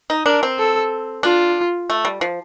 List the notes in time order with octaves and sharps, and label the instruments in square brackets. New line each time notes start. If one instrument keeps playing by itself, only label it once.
[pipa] D#4
[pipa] D4 [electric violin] A#4
[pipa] C4
[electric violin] A4
[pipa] D4 [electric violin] F4
[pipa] A3
G3
F3